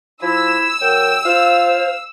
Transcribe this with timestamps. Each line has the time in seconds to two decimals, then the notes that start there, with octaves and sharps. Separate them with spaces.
0.22 F3 E4 E6
0.81 F#3 A#4 G5
1.25 F4 C5 F5